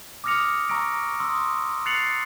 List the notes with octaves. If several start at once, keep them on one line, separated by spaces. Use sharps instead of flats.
D6 D#6 F6 A#6 C#7 F7
A#5 C#6 E6 A#6 D7
C6 D#6 E6
F#6 A6 C7 C#7 F7 F#7